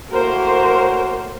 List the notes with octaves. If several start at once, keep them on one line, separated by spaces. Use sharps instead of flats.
A2 A#3 F#4 A#4 C5